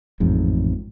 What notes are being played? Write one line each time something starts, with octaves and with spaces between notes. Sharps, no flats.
A1 F2 G#2